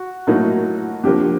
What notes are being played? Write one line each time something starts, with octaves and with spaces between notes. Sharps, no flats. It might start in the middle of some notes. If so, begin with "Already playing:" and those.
Already playing: F#4
A2 F#3 A#3 D#4
D3 F3 A#3 G4